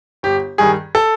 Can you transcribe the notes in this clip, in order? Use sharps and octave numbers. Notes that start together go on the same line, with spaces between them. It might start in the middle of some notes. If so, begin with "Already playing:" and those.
G1 G4
G2 D#3 G3 G#4
A4